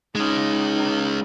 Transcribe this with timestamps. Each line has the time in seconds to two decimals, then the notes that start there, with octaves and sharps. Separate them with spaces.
0.15 G#3 C#4 D#4